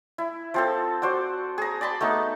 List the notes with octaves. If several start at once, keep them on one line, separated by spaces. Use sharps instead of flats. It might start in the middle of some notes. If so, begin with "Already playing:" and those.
E4
F3 C4 A4
F#4 C5 D5 F#5
G#4 A#5
D5 A5 B5 C6
A3 B3 D#4 C#6